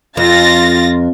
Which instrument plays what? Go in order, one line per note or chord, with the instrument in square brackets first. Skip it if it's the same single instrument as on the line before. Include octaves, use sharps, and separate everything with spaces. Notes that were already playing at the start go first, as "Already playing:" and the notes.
[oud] F2 [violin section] F4 A6 A#6